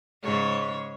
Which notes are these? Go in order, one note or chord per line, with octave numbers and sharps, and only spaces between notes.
G#2 C#3 C#5